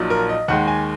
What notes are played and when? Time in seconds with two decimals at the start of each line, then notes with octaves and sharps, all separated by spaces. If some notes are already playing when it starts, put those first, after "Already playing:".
Already playing: A#1 A#2 F#3 D#4
0.10 A#4
0.29 D#5
0.48 D#2 D#3 G#3 F#5
0.67 G#5